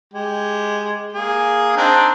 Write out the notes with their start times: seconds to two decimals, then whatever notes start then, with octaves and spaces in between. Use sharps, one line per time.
0.14 G#3 G4
1.13 A#3 G#4
1.77 C4 D4 D#4